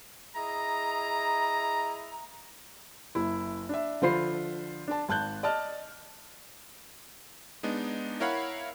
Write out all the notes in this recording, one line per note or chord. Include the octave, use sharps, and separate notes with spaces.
E4 G#4 D#5 A#5
F#1 E4
D4 E5
D3 F3 F4 C5 B5 C7
D4 A5
G#1 A5 F#6 G6
D5 D#5 A5 F6
G#3 B3 D4 D#4
E4 A#4 C#5 F5 F#5 B5